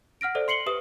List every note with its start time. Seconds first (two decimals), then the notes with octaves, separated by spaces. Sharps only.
0.21 F#5 F6 A#6 D7
0.35 A4 C5 D5 E5
0.48 C6 C7 C#7 F#7 G7
0.66 G4 B4 E5 D#6